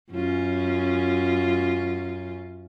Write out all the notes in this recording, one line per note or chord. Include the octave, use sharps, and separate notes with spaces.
F#2 C#4 F4